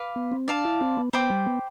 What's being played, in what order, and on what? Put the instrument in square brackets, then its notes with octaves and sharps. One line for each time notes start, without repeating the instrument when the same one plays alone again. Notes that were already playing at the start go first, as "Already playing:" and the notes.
Already playing: [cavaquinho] B4 F5 B5 D6
[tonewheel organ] B3
C4
[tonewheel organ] D4 [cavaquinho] D5 F5 A5
[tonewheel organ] E4
C4
B3
[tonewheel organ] B3 [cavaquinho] C5 G5 B5 D6
[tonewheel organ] G3
B3